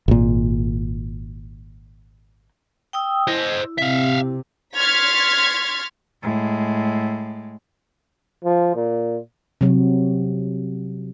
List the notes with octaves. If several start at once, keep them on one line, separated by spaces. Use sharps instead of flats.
G#1 A#2
G5 D#6 E6
E4 C5 D#5
C3 E5 F5
C6 C#6 F6 G#6 A6 B6
A2 G#3
F3
A#2
C3 F#3